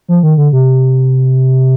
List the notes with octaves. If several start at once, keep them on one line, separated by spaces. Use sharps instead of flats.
F3
D#3
D3
C3